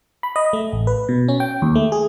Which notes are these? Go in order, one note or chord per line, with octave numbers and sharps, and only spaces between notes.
B5
D#5
A3
A1
B4
B2
C#4
G5
D#2
A3
G#4